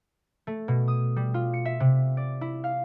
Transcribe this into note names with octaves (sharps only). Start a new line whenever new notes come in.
A3
B2
D#6
G3
F4
C#7
E5
C3
D5
E4
F5